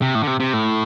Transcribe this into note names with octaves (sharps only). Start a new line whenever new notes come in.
C3
A2
D3
C3
C3
A2